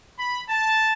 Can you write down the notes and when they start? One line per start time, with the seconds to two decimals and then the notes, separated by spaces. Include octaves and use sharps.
0.19 B5
0.49 A5